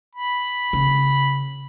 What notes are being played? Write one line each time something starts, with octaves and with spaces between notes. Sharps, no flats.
B5
C#3